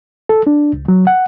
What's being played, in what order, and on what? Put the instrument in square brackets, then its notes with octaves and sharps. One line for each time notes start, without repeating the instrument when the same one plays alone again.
[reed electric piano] A4
D4
C#2
F#3
F#5